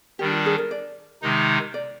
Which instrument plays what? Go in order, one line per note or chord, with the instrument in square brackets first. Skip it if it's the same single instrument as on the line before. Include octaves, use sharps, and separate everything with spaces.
[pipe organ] D#3 G3 D4 [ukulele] G4
[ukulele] F4
G#4
A#4
D5
[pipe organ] C3 D#3 G#3 D#4
[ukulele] D5